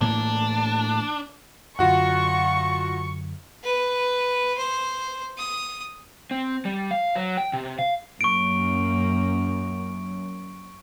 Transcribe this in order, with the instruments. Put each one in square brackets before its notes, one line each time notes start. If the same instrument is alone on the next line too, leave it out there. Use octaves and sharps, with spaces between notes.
[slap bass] A2 E3 A#3 [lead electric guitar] D4
[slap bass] F#2 D3 [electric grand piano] F4 F#4 F#5 [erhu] C#6
[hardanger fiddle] B4
C5
D#6
[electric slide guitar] C4
G3
F5
F#3
G5
C3
F5
[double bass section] F#2 [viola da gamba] A#3 [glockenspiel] C#6 D7